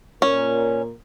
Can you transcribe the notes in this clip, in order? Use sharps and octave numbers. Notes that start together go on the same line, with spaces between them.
A#2 C#4 A#4